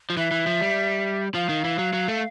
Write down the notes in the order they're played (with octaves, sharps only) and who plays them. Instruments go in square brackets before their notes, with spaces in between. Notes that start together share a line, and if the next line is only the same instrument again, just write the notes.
[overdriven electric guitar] F3
[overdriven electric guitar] E3 [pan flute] E5
[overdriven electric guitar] E3
F3
G3
[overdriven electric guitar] F3 [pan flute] F5
[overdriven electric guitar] D#3
E3
F#3
F#3
A3